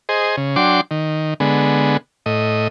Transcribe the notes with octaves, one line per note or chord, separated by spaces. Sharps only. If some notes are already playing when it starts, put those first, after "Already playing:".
G#4 C5 D#5
C#3
F#3 D4 G5 C6 D6
D#3
D3 G#3 B3
A2 D#5